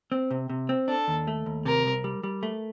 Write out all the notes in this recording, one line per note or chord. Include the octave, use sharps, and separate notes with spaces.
C4
C3
C3
C4
D4 A4
D#2
A3
D#2
C3 A#4
C2
G3
G3
A3